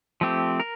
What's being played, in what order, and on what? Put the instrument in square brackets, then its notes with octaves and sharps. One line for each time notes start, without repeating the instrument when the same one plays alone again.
[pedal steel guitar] F3 A3 C4 G4
A#4